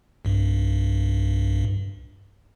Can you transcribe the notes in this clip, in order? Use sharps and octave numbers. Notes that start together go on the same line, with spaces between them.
B1 G2